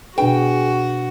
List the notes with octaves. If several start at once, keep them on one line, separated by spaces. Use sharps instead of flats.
B2 D4 F#4 G#4 B4 G5